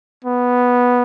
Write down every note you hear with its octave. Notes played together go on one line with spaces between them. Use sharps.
B3